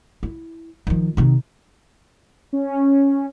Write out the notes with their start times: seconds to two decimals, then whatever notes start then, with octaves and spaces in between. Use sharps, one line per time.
0.23 E4
0.87 D#3 F3
1.17 C3 D#3
2.53 C#4